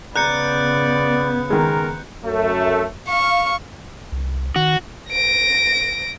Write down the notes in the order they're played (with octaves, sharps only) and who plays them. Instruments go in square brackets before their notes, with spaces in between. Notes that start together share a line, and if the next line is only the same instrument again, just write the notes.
[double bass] C#3 B3 [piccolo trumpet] D5 [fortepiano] A#5 [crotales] F#6 G6 C#7
[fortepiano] D#3 G#3 [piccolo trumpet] A#4
[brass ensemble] F#2 A3
[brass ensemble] F5 [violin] C#6
[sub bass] C2
[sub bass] D#3 [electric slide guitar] F#4
[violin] A#6 D7